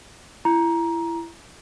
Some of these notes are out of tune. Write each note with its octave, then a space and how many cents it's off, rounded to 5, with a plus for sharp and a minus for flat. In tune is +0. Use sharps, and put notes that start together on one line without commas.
E4 +25 A#5 +15